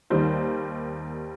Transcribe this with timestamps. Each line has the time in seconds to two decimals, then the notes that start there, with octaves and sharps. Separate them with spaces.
0.10 D#2 D#3 G3 C5